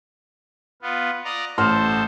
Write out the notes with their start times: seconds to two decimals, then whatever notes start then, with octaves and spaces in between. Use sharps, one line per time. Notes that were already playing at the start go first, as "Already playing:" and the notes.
0.82 B3 F4
1.25 D5 D#5 A#5
1.58 A1 A4 C5 C6 F6